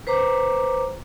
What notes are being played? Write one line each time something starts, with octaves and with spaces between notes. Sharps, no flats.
B4 C5 A#5 D6